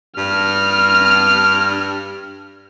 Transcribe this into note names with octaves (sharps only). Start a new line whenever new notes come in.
G2 F6